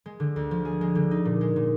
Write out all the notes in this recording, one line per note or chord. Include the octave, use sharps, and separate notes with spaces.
G#3
D3
D2
F3
G#4
G#3
D3
D#4
A#2
G#3
A#2